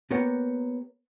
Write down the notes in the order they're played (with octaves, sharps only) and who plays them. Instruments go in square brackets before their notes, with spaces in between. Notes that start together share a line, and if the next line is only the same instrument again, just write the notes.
[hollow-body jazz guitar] A#3 B3 G4 A#4 C#5 F#5